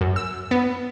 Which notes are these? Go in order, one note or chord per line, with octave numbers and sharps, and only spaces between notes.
F#2
E6
B3